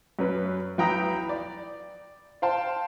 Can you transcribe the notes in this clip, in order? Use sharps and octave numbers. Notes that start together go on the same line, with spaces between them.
F#2 C#4 B4
B1 E3 G5 A#5 B5 D#6
D5
C5 F5 G5 A5